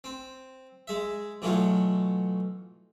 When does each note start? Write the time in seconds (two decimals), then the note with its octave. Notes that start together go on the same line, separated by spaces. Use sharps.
0.04 C4
0.87 G#3 E5
1.42 B2 E3 F#3 A3 F4